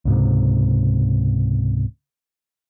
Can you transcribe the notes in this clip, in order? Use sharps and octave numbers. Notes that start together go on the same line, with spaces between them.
C#2 G#2 C3